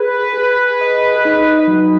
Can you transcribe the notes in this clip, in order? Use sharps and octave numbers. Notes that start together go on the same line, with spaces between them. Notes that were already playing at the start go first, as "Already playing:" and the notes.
Already playing: G#4 B4
G#4
D#5
D#4
F#3